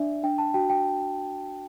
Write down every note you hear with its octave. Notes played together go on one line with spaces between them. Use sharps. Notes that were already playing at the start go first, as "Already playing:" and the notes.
Already playing: D4 D5 E5
D4 G5
A5
F#4 G5
G5